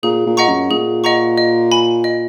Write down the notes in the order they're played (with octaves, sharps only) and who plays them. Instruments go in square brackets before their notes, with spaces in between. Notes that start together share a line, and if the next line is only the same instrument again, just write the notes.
[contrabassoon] A#2 [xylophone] G#4
[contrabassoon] A#2
[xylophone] D#5 F#5 A#5 C#6
[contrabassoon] F#2
[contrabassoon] A#2 [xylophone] G#4
[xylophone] D#5 F#5 A#5 C#6
D#5
G#5 B5
D#5